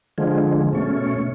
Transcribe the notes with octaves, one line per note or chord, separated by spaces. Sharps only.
D3 F3 G#3
B2 A3 C#4